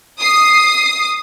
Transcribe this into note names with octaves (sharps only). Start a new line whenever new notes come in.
D#6 C7